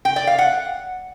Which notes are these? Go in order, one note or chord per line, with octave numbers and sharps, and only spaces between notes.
G5
D5
F5
F#5